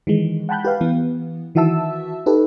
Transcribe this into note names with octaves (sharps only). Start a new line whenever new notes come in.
D#3 E3 G#3
F#5 G5 A5 B5 F#6 G6
G4 B4 F5
E3 B3
D#3 E3 F#4 E5 A5 E6
D#4 G4 A4 B4